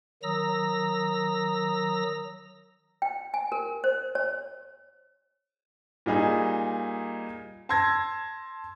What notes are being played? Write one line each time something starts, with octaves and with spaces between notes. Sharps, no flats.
D#3 F#3 A#5 D#6 E6 A#6
G5
G#5
A#4
C5
C#5
A#2 G3 D#4 G#4
A5 C6 E6 G#6 A#6